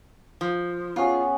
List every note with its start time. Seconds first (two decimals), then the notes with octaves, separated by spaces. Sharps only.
0.41 F3
0.96 B3 C#4 F4 G#4